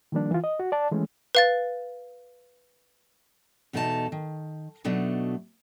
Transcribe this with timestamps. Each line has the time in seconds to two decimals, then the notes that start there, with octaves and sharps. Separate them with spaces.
0.12 D#3 F3 G3 A#3 D4
0.31 E3 F4
0.44 D#5
0.60 F#4
0.72 D5 A5
0.91 E3 G#3 A3 C#4
1.35 B4 F5 A6
3.73 E2 B2 A3 D#4 A#4 A5
4.12 D#3
4.84 B2 F#3 A3 D4 D#4